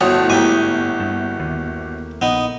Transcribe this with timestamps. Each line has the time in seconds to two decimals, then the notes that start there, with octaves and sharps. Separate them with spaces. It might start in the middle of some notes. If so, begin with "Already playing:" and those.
0.01 G1 A2 F3 F#4 C#5 D#6
0.30 G#2 A#3 G4 E5 G#5 D6
1.00 G2
1.40 D#2
2.22 A#1 B3 D#4